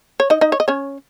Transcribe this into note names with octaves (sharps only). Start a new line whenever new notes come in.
C#5
D#4 D#5
D#4 D#5
C#5
D#5
C#4 C#5